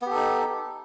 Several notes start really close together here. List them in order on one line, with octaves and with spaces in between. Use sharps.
B3 G4 A4 D#4